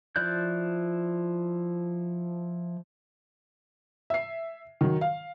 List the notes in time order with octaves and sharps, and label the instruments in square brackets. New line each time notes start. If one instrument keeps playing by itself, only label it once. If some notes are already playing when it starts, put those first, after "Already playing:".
[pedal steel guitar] F3 E4 D5 F#6 G6
[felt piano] E5 C7
D#3 F#3
F5